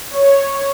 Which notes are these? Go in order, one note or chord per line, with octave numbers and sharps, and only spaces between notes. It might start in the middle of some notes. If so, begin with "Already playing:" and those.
C#5